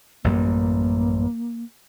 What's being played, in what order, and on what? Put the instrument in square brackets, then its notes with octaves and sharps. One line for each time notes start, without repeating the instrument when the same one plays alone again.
[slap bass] A1 F#2 G3 [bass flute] A#3